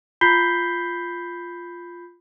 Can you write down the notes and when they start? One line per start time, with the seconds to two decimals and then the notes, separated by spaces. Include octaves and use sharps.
0.21 F4 B5 G6 B6 C7 G7